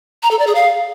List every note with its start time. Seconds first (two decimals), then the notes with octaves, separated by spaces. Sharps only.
0.23 A#5
0.31 A4
0.39 D5
0.47 G#4
0.55 F5